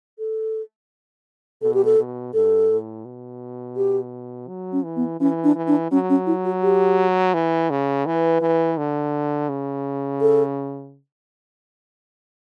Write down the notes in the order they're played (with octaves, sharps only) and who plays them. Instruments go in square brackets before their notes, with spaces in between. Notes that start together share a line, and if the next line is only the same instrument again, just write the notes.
[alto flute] A4
[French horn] B2 [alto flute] A4
[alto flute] G4
A4
[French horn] B2
[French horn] G2 [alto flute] A4
[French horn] A2
B2
[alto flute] G4
[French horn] F#3
[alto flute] C#4
[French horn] E3
[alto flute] B3
[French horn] E3 [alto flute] C#4
[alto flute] D4
[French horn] E3
[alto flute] D4
[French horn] F#3 [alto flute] C#4
[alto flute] C#4
E4
F#4
G4
[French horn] E3
C#3
[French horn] E3 [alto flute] B4
[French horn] E3
D3
C#3
[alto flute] A4